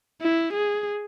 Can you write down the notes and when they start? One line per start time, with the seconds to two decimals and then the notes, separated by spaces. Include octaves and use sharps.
0.22 E4
0.54 G#4